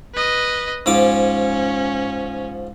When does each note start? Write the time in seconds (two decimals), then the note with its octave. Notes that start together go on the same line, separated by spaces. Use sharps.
0.14 B4 D#5
0.86 G#2 F3 C#4 D6